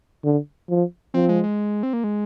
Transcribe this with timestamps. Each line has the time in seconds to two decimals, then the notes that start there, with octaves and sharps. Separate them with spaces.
0.24 D3
0.69 F3
1.14 F3 C4
1.29 G#3
1.44 G#3
1.83 C4
1.93 A#3
2.04 G#3